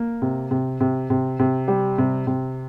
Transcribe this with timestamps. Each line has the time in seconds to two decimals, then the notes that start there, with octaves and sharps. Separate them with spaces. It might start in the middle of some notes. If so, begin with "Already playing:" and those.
Already playing: A#3
0.22 C3
0.51 C3
0.80 C3
1.10 C3
1.39 C3
1.68 G3
1.98 C3
2.27 C3